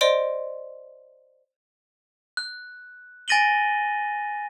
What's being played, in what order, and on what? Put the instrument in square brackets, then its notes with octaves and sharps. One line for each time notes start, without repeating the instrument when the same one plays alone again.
[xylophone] C5 D5 D#5 C6 D7
[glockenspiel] F#6
G#5 A6 A#6 D#7 F#7 G7